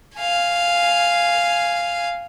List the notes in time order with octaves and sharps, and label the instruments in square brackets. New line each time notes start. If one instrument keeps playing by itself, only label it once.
[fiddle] F5 G#5